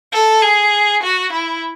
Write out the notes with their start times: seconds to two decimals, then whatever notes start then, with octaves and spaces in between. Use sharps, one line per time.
0.13 A4
0.42 G#4
1.03 F#4
1.32 E4